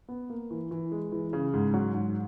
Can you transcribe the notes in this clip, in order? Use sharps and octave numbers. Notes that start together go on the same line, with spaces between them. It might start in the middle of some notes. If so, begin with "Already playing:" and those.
B3
A#3
E3
E3
G#3
E3
C#3
G#2
F#3
G#2